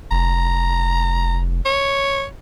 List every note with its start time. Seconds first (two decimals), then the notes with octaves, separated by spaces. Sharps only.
0.11 F1 A#5
1.65 C#5